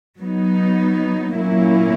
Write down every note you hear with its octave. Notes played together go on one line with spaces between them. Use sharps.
F#3 B3 D#4
A#2 F#3 A#3 C#4 E4